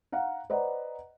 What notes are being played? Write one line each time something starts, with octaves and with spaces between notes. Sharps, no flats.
F5 F#5 A#5
B4 C5 D5 D#5 F#5 A#5